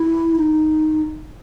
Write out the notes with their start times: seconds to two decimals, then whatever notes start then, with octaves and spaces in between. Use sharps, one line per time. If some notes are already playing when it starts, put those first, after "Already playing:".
Already playing: E4
0.37 D#4